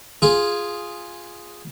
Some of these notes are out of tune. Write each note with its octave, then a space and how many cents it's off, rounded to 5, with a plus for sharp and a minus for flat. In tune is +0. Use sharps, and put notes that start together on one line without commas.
F4 +0 G#4 +0